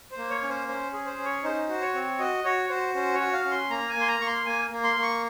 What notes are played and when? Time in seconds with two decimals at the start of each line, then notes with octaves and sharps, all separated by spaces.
0.11 C5
0.18 A#3
0.30 C#5
0.42 C#4
0.49 C5
0.68 C#4 C5
0.93 G#4
1.06 C5
1.18 C#4
1.25 C#5
1.43 D#4 C5
1.69 F#4
1.81 C#5
1.94 C4
2.19 F#4 D#5
2.44 F#4 C#5
2.69 F#4 C5
2.95 C#4 C5
3.14 C#5
3.20 F#4
3.33 F5
3.45 C#4
3.51 C6
3.70 A#3 A#5
3.89 G#5
3.95 A#3
4.01 C6
4.08 A#5
4.20 A#3 C#6
4.27 C6
4.46 A#3 G#5
4.71 A#3
4.84 C6
4.96 A#3
5.02 C#6